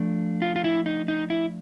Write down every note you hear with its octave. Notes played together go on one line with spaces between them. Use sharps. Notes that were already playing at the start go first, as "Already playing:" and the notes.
Already playing: F3 A3 D4
F4
F4
E4
D#4
D#4
E4